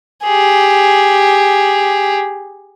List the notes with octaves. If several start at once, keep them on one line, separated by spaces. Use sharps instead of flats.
G4 G#4